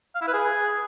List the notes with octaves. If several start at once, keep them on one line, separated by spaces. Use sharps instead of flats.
F5
E4
B4
G#4